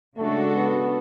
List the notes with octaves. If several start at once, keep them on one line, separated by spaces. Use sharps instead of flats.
C#3 G#3 A3 D4 F#4 A4
B3